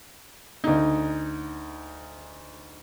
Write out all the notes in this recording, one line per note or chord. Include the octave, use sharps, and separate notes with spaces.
D2 D#4